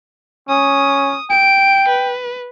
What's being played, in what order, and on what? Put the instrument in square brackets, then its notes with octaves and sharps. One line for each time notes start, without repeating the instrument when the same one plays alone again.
[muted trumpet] C#4 [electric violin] D#6
[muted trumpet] G5 [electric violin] D7
[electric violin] B4